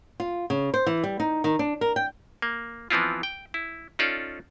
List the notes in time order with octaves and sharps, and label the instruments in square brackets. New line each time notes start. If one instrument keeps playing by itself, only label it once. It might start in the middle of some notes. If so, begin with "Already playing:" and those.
[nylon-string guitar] F4
C#3
C5
E3
G3
D#4
D#3
D4
A#4
G5
[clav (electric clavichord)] A#3
E3 F3 B3 C4 E4 F4
G5
E4
C#4 D#4 F4 A4 D5